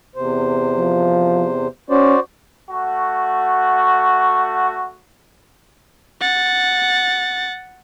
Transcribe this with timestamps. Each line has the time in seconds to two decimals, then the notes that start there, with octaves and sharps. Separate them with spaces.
0.16 E2 C3 C5
0.76 F3
1.90 C#4 F#4 C5 D5
2.70 A3 F#4
6.21 F#5 A6